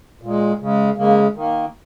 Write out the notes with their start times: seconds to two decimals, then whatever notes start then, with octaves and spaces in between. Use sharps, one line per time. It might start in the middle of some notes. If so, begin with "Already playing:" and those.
0.22 A#2 G#3
0.60 C#3 G#3
0.97 C#3 G#3 A#3
1.35 D#3 A#3